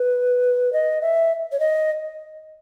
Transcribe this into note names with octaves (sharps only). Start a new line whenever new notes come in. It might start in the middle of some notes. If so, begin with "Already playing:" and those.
Already playing: B4
D#5
E5
C#5
D#5